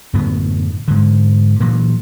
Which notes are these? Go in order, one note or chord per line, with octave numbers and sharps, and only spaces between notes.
F#2 A2 D3 B3
G#2 D3
A#2 E3 F#3